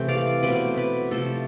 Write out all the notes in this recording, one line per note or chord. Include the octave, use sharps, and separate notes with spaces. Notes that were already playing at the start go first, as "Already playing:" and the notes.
Already playing: C3 E3 A3 C4 G5
D5 F5
B2 A3 C4 B4 D5
B4 D5
C3 F3 A3 A4 C5